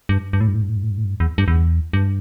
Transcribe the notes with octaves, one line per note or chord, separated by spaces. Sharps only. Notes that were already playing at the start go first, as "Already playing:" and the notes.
G2
G2
A2
G2
A2
G2
A2
G2
A2
G2
A2
G2
E2
G2
E2
G2